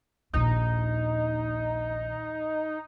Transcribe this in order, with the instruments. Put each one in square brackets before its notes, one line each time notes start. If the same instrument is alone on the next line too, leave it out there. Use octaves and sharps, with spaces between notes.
[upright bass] A#1 D#2 [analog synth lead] D#4